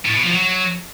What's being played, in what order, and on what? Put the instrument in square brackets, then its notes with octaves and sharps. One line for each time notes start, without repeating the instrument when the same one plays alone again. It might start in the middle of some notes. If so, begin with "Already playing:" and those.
[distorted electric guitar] A2
B2
F3
F#3